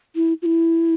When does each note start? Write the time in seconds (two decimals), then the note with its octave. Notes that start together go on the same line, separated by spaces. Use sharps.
0.16 E4
0.42 F4
0.46 E4